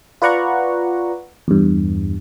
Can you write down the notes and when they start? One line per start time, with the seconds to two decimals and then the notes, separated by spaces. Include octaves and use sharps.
0.22 F4 B4 D5 F#5 A#5 C#6
1.48 E2 G2